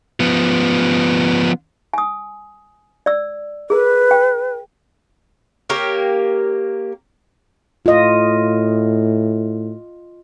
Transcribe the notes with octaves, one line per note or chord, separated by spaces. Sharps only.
F3 B3
G#5 D#6
D5 E6
G#4 A#4 B4
G5
A#3 G4 A#4 C#5
A2 F4 D#5